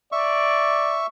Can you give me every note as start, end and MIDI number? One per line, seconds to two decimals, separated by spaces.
0.12 1.06 74
0.12 1.07 76
0.12 1.07 85